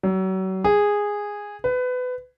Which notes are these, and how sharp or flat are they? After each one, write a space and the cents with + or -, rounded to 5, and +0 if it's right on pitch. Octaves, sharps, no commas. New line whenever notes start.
F#3 +35
G#4 -10
B4 +25